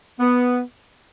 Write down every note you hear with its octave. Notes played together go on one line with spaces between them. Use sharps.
B3